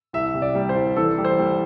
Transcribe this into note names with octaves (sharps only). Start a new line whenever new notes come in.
C2 E5
C3
D5
G3
C5
C2
E3 A4
G3
C5
G3